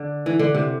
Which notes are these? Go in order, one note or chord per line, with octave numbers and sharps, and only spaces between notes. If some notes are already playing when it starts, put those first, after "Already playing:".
Already playing: D3
E3
D3
C3